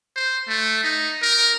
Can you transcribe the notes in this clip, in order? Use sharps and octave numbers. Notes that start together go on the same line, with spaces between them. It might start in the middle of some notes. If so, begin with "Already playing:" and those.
C5
A3
D#4
A#4